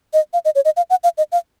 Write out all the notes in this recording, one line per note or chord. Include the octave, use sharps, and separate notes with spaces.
D#5
F5
D#5
C#5
D#5
F5
F#5
F5
D#5
F5